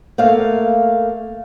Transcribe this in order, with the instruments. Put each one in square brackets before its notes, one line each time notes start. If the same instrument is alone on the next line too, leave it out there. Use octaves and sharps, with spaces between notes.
[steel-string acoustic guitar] A3 A#3 F5